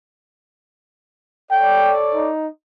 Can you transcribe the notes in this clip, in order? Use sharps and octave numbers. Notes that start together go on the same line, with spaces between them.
A4 C#5 D5 G5
D#4